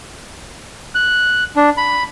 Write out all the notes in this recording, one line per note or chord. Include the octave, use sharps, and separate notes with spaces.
F#6
D4
B5